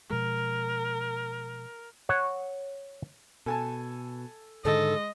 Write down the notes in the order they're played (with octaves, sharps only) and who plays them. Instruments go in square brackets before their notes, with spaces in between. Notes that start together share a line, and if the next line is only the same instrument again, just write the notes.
[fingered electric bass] B2 F3 G#3 [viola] A#4
[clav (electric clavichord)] C#5 F#5
[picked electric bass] B2 [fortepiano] A4 G#5 A5
[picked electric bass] G#2 D3 D#3 [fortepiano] G#3 [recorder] A4 [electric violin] D#5